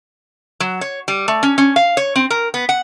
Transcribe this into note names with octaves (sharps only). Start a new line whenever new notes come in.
F#3
C#5
G3
A3
C#4
C#4
F5
C#5
C4
A#4
B3
F#5